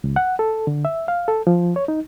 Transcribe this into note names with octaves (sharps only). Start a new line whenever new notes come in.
C#2
F#5
A4
D3
E5
F5
A4
F3
C#5
D#4